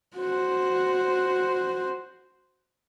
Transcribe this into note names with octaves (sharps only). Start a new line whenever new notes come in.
F#4 C5